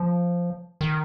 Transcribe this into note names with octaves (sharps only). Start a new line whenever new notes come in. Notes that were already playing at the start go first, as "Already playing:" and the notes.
Already playing: F3
D#3